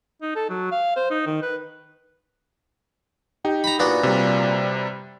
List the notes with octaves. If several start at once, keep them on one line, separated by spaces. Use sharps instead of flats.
D#4
A4
F#3
F5
C5
D#4
D#3
B4
D#4 G4
A#5 B5
A#2 B3 D4 F#4
C3 G3